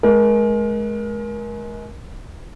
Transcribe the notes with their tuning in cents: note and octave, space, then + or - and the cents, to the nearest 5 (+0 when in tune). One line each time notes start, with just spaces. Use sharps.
G#3 +30 A#4 +30